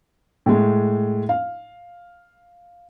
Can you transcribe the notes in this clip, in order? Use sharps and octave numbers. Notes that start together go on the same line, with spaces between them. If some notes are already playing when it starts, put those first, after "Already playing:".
A2 G#3
F5